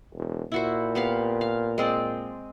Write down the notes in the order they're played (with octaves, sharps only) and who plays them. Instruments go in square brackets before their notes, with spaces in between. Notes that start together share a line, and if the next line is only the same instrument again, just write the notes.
[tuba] E1
[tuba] A#2 [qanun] E4 F#4 C5
[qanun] B3 G4 F5
F5
G#3 C4 D5